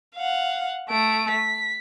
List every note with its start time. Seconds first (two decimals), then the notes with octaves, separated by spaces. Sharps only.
0.16 F5 F#5
0.90 A3 D7
1.31 B6